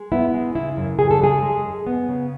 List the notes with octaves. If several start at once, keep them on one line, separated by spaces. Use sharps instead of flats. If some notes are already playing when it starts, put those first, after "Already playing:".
Already playing: G#3
B3 E4
G#3
C#3 E4
F#2
C#3 G#4
A4
G#3 G#4
G#3
F#2
B3
C#3